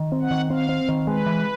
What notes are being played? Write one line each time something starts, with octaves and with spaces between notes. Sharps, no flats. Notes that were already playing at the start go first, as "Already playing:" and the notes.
Already playing: D#3
C4
F#5
D#3
C4 F5
C4
D#3
G#3 B4
E3